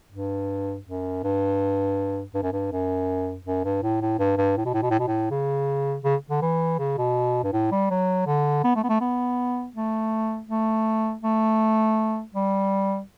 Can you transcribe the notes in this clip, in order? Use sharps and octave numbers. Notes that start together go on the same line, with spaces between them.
G2
F#2
G2
G2
F#2
G2
F#2
F#2
G2
A2
A2
G2
G2
A2
B2
A2
B2
A2
B2
A2
C#3
C#3
D3
E3
C#3
B2
G2
A2
G3
F#3
D3
B3
A3
B3
A3
B3
A3
A3
A3
G3